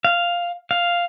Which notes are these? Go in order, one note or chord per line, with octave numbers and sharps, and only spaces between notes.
F5
F5